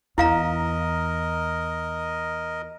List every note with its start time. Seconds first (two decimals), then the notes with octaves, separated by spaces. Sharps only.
0.18 E2 E4 A#4 D#5 F5 A#5